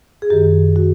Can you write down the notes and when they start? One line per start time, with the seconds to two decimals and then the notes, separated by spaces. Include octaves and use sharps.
0.22 G#4
0.30 F#2 D#3 G4
0.76 F#4